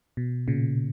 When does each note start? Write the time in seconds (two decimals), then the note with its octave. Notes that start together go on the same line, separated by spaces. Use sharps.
0.17 B2
0.48 A#2 C#3